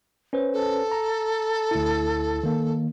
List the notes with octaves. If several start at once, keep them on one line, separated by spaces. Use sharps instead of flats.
C#4 B4 C5
A4
A#5
D2 E4
D#3 A#3